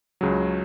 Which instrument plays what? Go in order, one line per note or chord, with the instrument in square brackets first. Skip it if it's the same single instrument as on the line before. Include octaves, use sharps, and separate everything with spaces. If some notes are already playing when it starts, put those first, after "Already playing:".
[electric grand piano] C#2 C#3 F#3